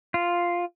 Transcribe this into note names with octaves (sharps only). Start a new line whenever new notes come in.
F4